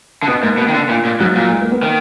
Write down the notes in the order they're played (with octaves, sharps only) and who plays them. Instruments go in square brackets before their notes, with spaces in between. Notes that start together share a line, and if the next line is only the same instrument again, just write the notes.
[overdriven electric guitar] D3
[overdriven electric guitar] B2 [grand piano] B3
[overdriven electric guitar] G#2 [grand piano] A#3
[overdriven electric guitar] B2
D#3
D3
A#2
A#2
[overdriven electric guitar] G#2 [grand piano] F#3
[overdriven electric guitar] A#2
[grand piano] G#3
A#3
B3
[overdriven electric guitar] D#3 [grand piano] A#3